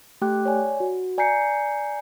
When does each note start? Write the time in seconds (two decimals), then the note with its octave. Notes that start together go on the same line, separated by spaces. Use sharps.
0.21 A3 G4 G5 D6 F#6
0.45 C#5 D5 G#5
0.80 F#4
1.18 D5 G#5 A#5 G6 C7 C#7